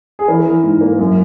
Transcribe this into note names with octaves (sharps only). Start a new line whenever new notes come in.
G#4
E3 A#4
E3
G#2
A#3
F#2